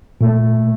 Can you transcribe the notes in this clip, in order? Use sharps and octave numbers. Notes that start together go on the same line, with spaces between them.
A#2 A3